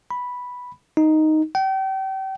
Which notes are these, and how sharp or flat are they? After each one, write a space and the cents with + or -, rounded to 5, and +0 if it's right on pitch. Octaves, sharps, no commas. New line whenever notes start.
B5 -5
D#4 +0
G5 -35